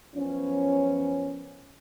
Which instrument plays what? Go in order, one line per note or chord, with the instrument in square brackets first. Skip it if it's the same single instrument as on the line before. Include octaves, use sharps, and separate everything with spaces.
[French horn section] F#2 F3 B3 C#4